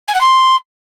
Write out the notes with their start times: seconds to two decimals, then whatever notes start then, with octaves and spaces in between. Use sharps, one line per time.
0.08 G#5
0.14 F#5
0.21 C6